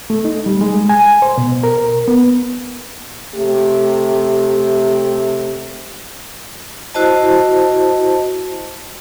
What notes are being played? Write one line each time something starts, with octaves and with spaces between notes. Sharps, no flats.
A3
D#4
G3
G#3
G#5
C5
B2
A#4
B3
C3 A3 G4
E4 F#4 C5 D#5 A5